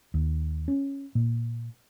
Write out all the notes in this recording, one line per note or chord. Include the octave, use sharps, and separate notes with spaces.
D#2
C#4
A#2